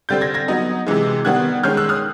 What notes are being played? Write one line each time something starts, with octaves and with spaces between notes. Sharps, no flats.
D3 G3 C4 G6 A6
G#6 A#6
G#6 A#6
F#3 B3 D#4
C3 E3 G#3
D#3 G3 B3 F#6 G#6
D#3 G#3 C#4 F6 G6
E6 F#6
D#6 F6